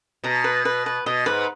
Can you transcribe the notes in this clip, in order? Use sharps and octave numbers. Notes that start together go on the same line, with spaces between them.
B2 A#5
B4
B4
B4
B2 D#5
G#2 B4